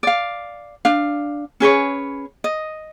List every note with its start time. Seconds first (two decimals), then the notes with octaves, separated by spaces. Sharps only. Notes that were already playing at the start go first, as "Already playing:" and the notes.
0.03 D5 F5
0.85 D4 F5
1.60 C#4 G#4 B4 C#5
2.44 D#5